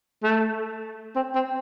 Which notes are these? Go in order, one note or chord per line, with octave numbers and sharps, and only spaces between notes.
A3
C4
C4